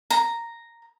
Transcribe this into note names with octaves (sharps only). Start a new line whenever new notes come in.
A#5